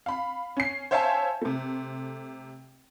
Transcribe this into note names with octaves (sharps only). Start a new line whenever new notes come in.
F5 B5
C#4 C7
C5 C#5 E5 F5 G#5 A5
C3 A3